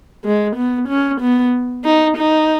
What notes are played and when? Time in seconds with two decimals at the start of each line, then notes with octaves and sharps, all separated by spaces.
0.24 G#3
0.56 B3
0.89 C#4
1.21 B3
1.85 D#4
2.17 D#4